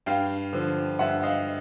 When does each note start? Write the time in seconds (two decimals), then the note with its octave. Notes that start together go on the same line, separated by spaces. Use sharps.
0.06 G2 F5 G5
0.53 D3 F3
0.99 G2 E5 F#5
1.23 D#5 F5